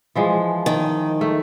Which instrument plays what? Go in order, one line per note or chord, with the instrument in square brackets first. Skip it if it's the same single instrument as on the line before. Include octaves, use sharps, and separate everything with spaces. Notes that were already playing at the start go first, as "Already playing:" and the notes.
[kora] E3 F3 G#3
[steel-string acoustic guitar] D#3
[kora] A3